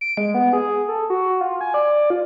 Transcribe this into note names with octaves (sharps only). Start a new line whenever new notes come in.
D7
G#3
B3
G#4
A4
F#4
F4
G#5
D5
F4